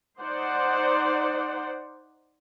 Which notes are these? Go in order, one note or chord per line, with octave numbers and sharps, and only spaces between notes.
D#4 C5 D5 F#5